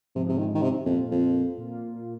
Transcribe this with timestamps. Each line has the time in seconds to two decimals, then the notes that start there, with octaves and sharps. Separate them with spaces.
0.15 G#2 C3 F3 G#3
0.29 C3
0.38 D#3
0.55 D#3
0.62 C3
0.86 F2 A#2 A#3 F4
1.11 F2
1.58 A#2 A#3 F4